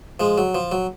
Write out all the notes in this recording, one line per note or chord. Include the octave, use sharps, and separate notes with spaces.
F3 G#3
F#3
F3
F#3